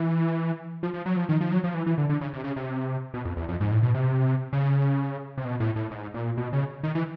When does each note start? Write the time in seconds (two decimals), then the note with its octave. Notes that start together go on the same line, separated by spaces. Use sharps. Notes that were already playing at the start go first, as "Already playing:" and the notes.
Already playing: E3
0.83 F3
0.94 F3
1.06 F#3
1.16 F3
1.29 D#3
1.41 F3
1.52 F#3
1.64 F3
1.74 E3
1.86 E3
1.98 D3
2.09 D3
2.21 C#3
2.33 C3
2.44 C#3
2.56 C3
3.14 B2
3.25 F2
3.37 E2
3.48 F2
3.60 G#2
3.71 A2
3.83 B2
3.94 C3
4.53 C#3
5.38 C3
5.45 B2
5.60 A2
5.76 A2
5.91 G#2
6.14 A#2
6.37 B2
6.53 C#3
6.83 D#3
6.95 E3